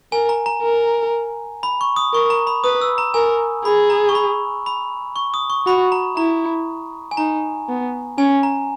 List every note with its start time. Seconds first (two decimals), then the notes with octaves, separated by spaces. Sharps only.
0.12 A#4 G#5
0.29 A#5
0.46 A#5
0.62 A#4
1.63 B5
1.81 C#6
1.96 D#6
2.13 A#4 C#6
2.30 A#5
2.47 B5
2.64 B4 D#6
2.81 E6
2.98 A#5
3.14 A#4 G#5
3.65 G#4 B5
3.90 A#5
4.09 C#6
4.15 B5
4.66 B5
5.16 C#6
5.34 D#6
5.50 C#6
5.66 F#4 B5
5.92 A#5
6.17 E4 A#5
7.11 G#5
7.17 D#4 A#5
7.69 B3
8.18 C#4 G#5
8.43 A#5